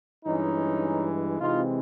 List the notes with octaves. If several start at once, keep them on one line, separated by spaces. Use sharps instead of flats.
G2 E3 G#3 C#4 D#4
C3 E3 G#3 C4 D#4 F4